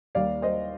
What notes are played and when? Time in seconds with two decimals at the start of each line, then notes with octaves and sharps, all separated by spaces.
0.15 D#2 D#3 G3 D5 F5
0.42 C5 D#5